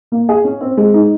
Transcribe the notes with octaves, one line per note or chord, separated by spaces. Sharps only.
A#3
G#4
C#4
C4
G#3
D#4